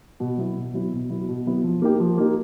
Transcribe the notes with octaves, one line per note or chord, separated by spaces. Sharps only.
B2
F#3 B3 E4
B2
F#3 B3 E4
B2
F#3 B3 E4
B2
F#3 B3 E4
F3
A#3 D#4 G4
F3
A#3 D#4 G4